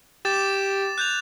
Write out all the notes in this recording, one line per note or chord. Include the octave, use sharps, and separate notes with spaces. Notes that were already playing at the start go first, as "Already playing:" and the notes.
G4 D6 A6 E7
F#6 G6 F7